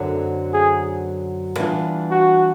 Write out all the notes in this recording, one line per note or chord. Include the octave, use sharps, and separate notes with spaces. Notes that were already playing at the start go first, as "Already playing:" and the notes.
Already playing: F#2 D3 F#3 A3 C4
G#4
E3 G3 B3 D4 F4
F#4